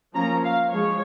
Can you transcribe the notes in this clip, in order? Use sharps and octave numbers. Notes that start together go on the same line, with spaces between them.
F3 A#3 C#4 A#5
F5
F3 G#3 C#5